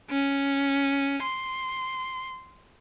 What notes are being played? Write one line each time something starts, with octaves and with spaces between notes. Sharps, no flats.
C#4
C6